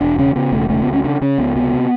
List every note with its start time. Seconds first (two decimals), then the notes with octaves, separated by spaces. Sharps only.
0.01 E1 D4
0.18 C#3 C#4
0.35 C#3 B3
0.52 E1 A3
0.70 C#3 A3
0.82 B3
0.87 D2
0.93 C#4
1.04 C#3 D4
1.21 C#3 C#4
1.38 C#2 B3
1.56 C3 B3
1.73 C3